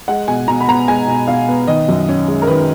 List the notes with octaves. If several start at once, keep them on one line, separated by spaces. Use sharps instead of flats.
G#3 F#5
B2 G#5
B2 A#5
B5
B3 A#5
G#3 G#5
B2
B2 F5
B3
D#3 D#5
F#2
C#4
G#3
A#4
D#3 B4